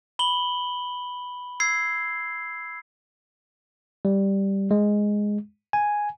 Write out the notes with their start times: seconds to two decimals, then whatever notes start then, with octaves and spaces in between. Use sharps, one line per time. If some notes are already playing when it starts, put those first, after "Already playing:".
0.19 B5 F#7 G7
1.60 E6 G#6 C7
4.05 G3
4.71 G#3
5.73 G#5